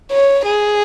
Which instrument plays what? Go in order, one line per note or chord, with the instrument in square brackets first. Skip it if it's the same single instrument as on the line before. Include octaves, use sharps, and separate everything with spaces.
[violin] C#5
G#4